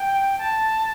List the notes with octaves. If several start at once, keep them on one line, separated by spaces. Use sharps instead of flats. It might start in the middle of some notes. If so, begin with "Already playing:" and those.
Already playing: G5
A5